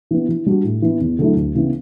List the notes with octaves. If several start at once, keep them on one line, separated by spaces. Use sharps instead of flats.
E3 B3
E3
G3 D4 F#4
A2
E3 B3
E2
D3 F#3 A3 E4
D2
C#3 E3 B3